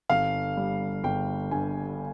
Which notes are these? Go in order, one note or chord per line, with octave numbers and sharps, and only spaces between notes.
G1 F5
G3
G1 G5
G2 G#5